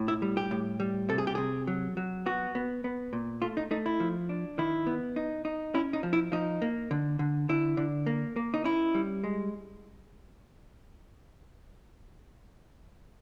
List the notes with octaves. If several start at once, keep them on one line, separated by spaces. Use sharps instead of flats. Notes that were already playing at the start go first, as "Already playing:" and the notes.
Already playing: A2
E4
G3
G4
A2
G3
C3 A4
G#4
G4
C3 G#4
F#3
F#3
B3 F#4
B3
B3
A#2
A3 F4
D#4
A3 D#4
E4
F3
D4
D#3 E4
B3
D#4
D#4
C#4 E4
D#4
F3
E4
F3 D#4
A#3
D3
D3
D3 E4
D3
A#3
A#3
D#4
C#4 E4
G3
G#3